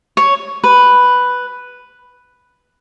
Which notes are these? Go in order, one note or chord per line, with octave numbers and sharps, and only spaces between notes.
C#5
B4